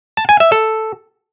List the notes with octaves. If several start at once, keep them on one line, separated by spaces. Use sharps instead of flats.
A5
G#5
E5
A4